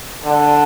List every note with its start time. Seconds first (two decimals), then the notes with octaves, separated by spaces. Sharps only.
0.25 D3